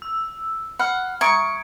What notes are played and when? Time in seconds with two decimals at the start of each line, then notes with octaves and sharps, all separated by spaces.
0.02 E6
0.79 F#5 B5 F6
1.21 E5 A#5 C#6 D#6 G#6 C#7 D7